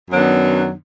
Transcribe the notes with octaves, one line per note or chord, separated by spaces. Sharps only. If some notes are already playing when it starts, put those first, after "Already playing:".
F#2 D#3 F#3 B3 D4